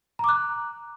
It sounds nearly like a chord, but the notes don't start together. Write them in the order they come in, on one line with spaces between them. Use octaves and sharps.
A#5 D6 F#6